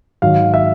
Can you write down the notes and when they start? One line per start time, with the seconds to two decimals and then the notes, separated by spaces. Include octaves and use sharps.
0.22 G#2 D#3 F#3 F5
0.54 E5